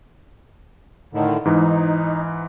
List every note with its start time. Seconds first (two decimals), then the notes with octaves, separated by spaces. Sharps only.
1.14 A2 D3 D#3
1.45 G#2 E3 D#4